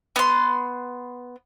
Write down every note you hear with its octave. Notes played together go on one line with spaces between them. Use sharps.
B3 C6